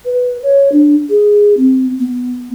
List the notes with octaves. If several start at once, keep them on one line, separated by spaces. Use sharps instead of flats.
B4
C#5
D4
G#4
C4
B3